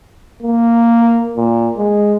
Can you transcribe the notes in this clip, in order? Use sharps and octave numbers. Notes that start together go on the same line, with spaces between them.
A#3
A#2
G#3